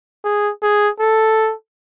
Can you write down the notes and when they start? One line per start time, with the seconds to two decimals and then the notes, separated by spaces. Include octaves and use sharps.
0.24 G#4
0.62 G#4
1.00 A4